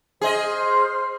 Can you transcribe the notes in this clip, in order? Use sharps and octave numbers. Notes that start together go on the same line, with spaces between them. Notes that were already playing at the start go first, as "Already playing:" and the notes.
G#4 C5 D#5 F6